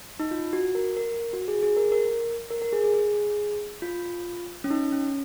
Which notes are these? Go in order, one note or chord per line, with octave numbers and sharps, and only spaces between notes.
D#4
F4
F#4
A#4
A#4
F#4
G#4
G#4
A#4
A#4
A#4
A#4
G#4
G#4
G#4
F4
C#4
D#4
C#4